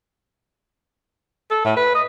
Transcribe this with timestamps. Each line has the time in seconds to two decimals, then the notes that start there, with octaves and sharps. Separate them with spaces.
1.50 A4
1.65 A2
1.76 B4
1.94 D#5